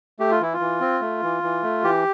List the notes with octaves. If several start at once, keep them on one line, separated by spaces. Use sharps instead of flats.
A3 G4
F4
E3 E4
F4
E3
C4
A3
E3
E3
A3
E3 G4